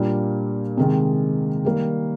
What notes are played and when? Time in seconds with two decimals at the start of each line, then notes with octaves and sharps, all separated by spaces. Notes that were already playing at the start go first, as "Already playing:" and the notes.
Already playing: A#2 G3 A#3 D4
0.78 C3 D#3 G#3
1.65 D#3 G3 A#3